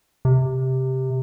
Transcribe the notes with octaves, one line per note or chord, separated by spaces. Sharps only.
C3